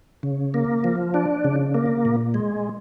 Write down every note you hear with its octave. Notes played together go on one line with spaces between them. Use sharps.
C#3
A#3
F3
D4
C#3
A#3
A#2
G#3